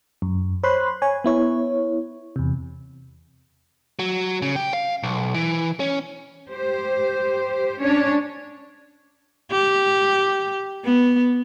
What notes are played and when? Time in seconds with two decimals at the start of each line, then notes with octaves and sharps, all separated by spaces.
0.22 F#2
0.63 C5 C#5 B5 C6 F#6
1.02 C#5 G#5
1.24 B3 E4 C#5
2.36 E2 C3
3.99 F#3
4.42 C#3
4.56 G4
4.74 F5
5.03 B1
5.34 E3
5.80 C#4
6.51 G4 C5
7.81 C#4 D4 C#5
9.52 G4
10.84 B3